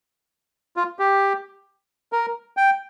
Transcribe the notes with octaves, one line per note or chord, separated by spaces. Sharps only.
F4
G4
A#4
G5